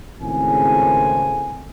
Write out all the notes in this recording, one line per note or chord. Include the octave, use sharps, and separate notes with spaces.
G#1 A2 C#3 C4 G#5